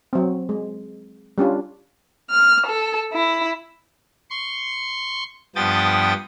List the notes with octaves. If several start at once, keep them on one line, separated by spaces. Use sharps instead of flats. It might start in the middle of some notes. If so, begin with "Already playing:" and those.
F#3 C4
G#3
G3 C#4 D4 F4
F6
A4
E4
C6 C#6
G2 F3 B3 G5 D#6 A6